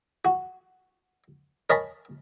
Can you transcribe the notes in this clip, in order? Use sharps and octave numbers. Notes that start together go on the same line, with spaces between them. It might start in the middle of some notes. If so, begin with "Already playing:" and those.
F#4
A#4 C#5 D#5 G#5 A5 B5